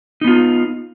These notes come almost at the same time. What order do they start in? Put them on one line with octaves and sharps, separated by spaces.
D#4 B3 F4